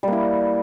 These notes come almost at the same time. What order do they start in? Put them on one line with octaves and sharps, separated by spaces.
G3 A#3 E4